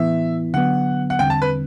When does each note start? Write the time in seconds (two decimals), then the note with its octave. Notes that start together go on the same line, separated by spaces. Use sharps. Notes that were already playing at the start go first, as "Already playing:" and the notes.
Already playing: A2 E3 B3 E4 E5
0.54 D3 F#3 B3 F#5
1.10 F#5
1.19 E2 D3 G3 C4 G5
1.30 A5
1.42 B4